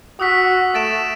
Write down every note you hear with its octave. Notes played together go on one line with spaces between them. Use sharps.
F#4 D#6 E6 B6
A3 A6 D7 E7